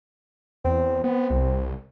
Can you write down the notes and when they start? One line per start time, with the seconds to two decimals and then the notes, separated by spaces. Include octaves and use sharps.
0.65 E2 C4
1.04 B3 C4
1.30 C2